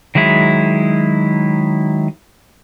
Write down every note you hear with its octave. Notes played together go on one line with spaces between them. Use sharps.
D#3 F#3 G#3 E4